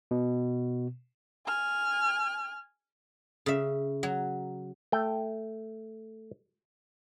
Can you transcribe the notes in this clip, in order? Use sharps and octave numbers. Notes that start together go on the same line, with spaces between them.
B2
G#5 F6
C#3 E5
F#3
A3 G5